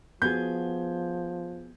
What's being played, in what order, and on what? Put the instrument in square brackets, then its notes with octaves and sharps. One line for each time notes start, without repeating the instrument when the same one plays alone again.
[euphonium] F3 [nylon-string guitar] B3 F#4 G#4 [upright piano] G6 G#6